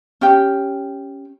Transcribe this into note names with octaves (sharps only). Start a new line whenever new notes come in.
C#4 G4 G5